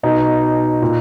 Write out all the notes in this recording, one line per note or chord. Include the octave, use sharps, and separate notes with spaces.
B2 D#4
A#2